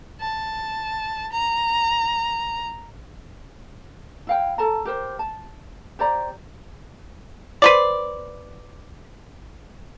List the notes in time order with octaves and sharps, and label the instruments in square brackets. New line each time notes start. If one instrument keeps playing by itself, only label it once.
[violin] A5
A#5
[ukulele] E4 F5 G5
A4 A5 A#5
G4 A#4 C5
A5
G4 C5 D5 A#5
[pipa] B4 C5 D5